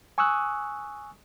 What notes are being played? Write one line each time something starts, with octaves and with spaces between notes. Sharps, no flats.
G#5 C#6 D#6 E6 F#6